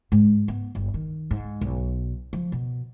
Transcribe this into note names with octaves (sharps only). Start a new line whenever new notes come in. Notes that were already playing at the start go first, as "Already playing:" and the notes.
G#2
B3
G1
D#3
G#2
B1
F3
B2